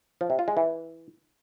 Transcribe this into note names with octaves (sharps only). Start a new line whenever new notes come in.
F3
C3
F4
G#3
E3